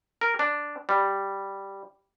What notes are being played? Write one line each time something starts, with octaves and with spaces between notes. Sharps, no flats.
A#4
D4
G3